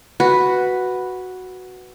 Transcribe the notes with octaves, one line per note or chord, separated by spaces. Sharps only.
F#4 B4